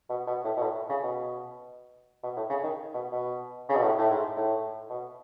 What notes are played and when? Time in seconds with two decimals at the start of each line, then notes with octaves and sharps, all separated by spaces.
0.10 B2
0.27 B2
0.45 A2
0.57 B2
0.62 A2
0.90 C#3
1.03 B2
2.24 B2
2.37 A2
2.50 C#3
2.63 D#3
2.94 B2
3.12 B2
3.69 C#3
3.76 B2
3.83 A2
3.98 A2
4.10 G#2
4.37 A2
4.90 B2